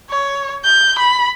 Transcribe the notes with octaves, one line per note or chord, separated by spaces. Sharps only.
C#5
G6
B5